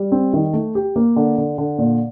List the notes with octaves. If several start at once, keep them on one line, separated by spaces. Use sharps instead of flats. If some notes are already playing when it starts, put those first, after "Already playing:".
Already playing: G3
C4
D#3
A3
G4
A#3
D3
D3
D3
A#2